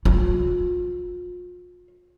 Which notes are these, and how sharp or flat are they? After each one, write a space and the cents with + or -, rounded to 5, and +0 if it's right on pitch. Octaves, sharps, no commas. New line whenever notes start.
F4 +35